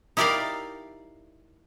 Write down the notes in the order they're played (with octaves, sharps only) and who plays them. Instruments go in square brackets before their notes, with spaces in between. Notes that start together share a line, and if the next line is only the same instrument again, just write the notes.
[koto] D#4 E4 G4 A#4 D5 F5